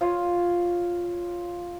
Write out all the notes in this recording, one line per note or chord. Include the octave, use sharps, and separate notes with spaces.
F4 C#5 F5 D#6